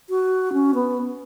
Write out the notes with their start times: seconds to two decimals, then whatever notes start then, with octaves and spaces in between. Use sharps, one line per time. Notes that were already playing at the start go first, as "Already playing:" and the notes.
0.09 F#4
0.53 C#4
0.74 B3